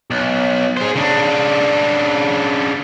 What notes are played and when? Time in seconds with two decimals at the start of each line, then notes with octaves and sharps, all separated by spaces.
0.11 B1
0.77 G#4 C5
0.96 C#3 D4